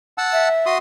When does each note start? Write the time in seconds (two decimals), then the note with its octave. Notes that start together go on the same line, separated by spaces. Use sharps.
0.18 F#5 A5 E6
0.33 E5
0.66 F#4 C6 D#6